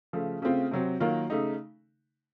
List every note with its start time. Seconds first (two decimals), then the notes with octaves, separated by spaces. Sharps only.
0.13 C#3 F3 A3
0.42 C#3 A3 C4 F4
0.72 C3 F#3 C4
1.00 D#3 F#3 A#3 F4 A#4
1.30 C#3 A3 D#4